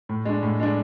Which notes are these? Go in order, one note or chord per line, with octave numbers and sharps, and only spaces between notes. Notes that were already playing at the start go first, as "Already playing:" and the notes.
A2
G#3 D4
A2
G#3 D4